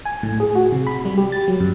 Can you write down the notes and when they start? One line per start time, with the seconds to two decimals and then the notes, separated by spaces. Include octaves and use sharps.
0.06 G#5
0.23 A2
0.40 G#4
0.55 F#4
0.72 C3
0.87 B5
1.05 G3
1.18 G4
1.32 A6
1.48 F#3
1.60 F#2